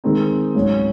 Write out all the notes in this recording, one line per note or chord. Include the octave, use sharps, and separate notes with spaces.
D#3 G#3 C4 D#4
G#2 F#3 C#4